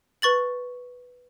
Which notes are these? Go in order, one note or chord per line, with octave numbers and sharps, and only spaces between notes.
B4 C#6 A6 F#7